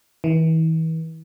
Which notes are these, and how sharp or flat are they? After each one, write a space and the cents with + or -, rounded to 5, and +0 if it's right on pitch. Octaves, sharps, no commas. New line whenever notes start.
E3 -40